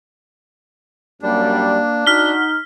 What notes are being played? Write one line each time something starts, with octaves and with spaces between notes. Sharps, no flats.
F#2 G3 A#3 D4
D#4 F#4 F6 B6 G7